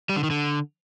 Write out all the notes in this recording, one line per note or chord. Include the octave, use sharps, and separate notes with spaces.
G3
D3
D#3
D3